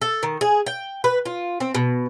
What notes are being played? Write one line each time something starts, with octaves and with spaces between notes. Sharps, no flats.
A4
D#3
G#4
G5
B4
F4
C4
B2